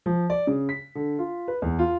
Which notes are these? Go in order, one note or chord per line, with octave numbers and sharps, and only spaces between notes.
F3
D5
C#3
B6
D3
F4
B4
E2
F4